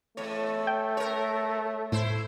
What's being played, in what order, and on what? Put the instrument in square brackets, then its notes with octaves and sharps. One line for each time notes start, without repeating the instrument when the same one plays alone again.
[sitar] E2 C#5 [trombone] A3
[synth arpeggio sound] G5
[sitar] A#4 C#5
[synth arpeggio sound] A2 [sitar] E4 C5